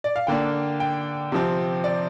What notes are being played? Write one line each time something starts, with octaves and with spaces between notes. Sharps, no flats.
D5
F5
D3 A#3 D4 G5
G5
C3 F3 C4
D5